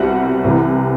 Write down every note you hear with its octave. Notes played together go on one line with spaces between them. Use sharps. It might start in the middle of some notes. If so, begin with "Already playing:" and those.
Already playing: C2 B2 G3 C4 F#5
C2 C3 E3